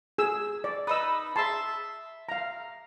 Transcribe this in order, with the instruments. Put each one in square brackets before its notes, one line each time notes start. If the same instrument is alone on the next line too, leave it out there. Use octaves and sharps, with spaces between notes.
[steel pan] G#4 E6
D5
[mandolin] D#4 B4 [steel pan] D#6 E6
[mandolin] G#4 E5 [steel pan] A5 C6
[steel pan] F5 A#5